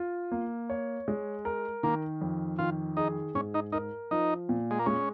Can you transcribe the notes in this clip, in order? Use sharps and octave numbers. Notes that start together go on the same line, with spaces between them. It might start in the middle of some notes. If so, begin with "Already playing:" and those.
Already playing: F4
A#3
C#5
G#3
A#4
D#3 A#3
F2
D#3 F4
D#4 G#4
G#2 C#4
D#4
D#4 A#4
F3 D#4
A#2
G#3
A#3
G#3 C#4